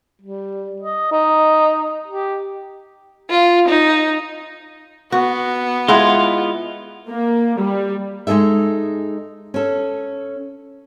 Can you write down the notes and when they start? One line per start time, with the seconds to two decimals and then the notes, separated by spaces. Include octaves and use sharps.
0.22 G3
0.82 D#5
1.12 D#4
2.07 G4
3.30 F4
3.68 D#4
5.12 B3 F#4
5.88 G#3 E4 F4 F#5
7.09 A#3
7.59 G3
8.27 G#3 D#4 G#4 A4 E5
9.54 C#4 A4